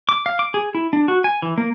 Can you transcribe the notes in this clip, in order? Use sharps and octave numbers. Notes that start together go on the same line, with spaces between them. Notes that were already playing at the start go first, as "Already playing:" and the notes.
D6
F5
D6
G#4
E4
D4
F#4
G#5
E3
A#3